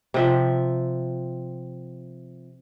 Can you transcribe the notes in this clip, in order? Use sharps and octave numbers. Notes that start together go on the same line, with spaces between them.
C3 F3 E5